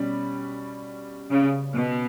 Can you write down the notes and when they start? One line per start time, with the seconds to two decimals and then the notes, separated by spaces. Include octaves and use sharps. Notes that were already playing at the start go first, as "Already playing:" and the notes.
Already playing: B2 G3 C#4
1.30 C#3
1.75 B2